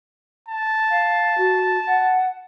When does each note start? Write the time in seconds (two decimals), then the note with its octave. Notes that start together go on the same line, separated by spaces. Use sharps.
0.48 A5
0.89 F5
1.37 F#4
1.86 F#5